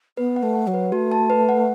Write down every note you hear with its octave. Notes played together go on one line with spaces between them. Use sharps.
B3 B4
F#5
A3
F#5
F#3
B4
A3 F#4
A5
B4
F#5